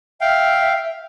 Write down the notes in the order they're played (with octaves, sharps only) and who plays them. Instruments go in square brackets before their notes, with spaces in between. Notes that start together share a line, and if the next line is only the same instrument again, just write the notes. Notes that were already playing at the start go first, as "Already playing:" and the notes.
[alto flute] E5 [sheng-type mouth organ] F5 G5